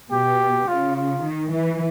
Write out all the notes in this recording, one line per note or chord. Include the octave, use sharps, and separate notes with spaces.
B2 G4
C#3 F4
F4
D#3
E3